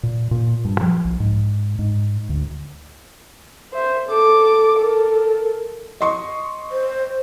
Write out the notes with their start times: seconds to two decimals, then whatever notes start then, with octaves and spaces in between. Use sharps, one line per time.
0.03 A#2
0.31 A#2
0.65 G2
0.81 F3
1.05 B1
1.20 G#2
1.79 G#2
2.29 D2
3.73 C5 E5
4.08 A4 D6
4.77 A4 A#4
6.01 D#5 C6 C#6
6.72 C5